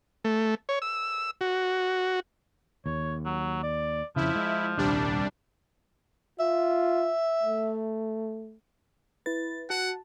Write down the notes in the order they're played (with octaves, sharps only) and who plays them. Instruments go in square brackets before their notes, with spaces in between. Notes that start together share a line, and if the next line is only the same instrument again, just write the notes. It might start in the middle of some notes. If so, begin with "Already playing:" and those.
[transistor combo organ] A3
C#5
E6
F#4
[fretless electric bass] D#2 [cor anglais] C#5
[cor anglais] F#3
D5
[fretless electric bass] F2 C#3 [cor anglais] F3 [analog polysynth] E4
[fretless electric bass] G#3
[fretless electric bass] D#1 [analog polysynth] C2 G3 D4
[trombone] F4 [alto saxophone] E5
[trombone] A3
[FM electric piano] E4 B4 [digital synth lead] A6
[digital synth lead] F#4 [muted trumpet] F#5 [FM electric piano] A5